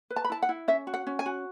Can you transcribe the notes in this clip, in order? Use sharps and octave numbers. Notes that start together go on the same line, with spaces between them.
B4
A5
B5
E4 A5
F#5
E4
C#4 E5
F#4
F#5
C#4
G#5
F#4